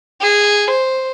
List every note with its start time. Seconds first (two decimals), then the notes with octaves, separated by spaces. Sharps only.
0.21 G#4
0.70 C5